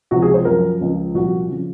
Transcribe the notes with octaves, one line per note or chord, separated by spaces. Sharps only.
C#2 C3 F3 F#4
G#4
C5
F#2 F3 A#4
C#2 C#3 F3
C2 A#2 F3 F#4
C#3 F3